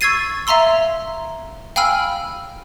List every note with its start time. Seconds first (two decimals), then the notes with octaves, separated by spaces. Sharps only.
0.01 C#6 E6 G#6 A6 C7 D#7
0.47 E5 F5 A#5 C6 E6
1.76 F5 G5 G#5 B5 E6 F6